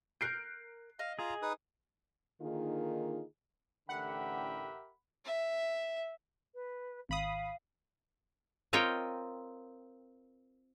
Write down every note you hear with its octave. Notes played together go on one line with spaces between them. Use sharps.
A#4 F#6 G6 C7 D7
D#5 F5
F4 G#4 A#5
D#4 B4 D#6
D3 D#3 A#3 D#4 F4 G#4
A1 D3 G4 A#4 E5 F#5 G5 B5
E5
B4
G#1 F5 B5 D#6
C4 F4 A#4 C#5 D#5 G5